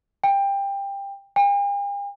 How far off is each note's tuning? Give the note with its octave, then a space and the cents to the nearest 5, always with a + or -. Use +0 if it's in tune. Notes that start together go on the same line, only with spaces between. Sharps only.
G5 +20
G5 +45